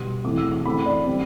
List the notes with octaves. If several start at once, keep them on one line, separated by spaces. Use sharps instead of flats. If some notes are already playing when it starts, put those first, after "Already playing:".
Already playing: B2 G3 B3 C6
E3 A3 C4 D6
E6
D6
E3 A3 C4 B5
D5
G3 C4